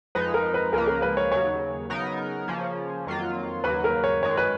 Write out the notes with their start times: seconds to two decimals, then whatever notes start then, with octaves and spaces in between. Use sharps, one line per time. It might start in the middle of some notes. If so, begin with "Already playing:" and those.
0.15 F2 F3 G#3 D#4 B4
0.34 A#4
0.54 B4
0.73 C#2 C#3 F3 A#3 A#4
0.88 A#4
1.02 B4
1.17 C#5
1.32 D#2 C#3 F#3 C#5
1.90 C#3 F#3 B3 D#4 A#4
2.48 C#3 F3 A#3 C#4
3.06 F2 D#3 F#3 A#3 F4
3.64 D#2 C#3 F#3 A#3 B4
3.84 A#4
4.04 C#5
4.22 F#2 D#3 G#3 C#5
4.37 B4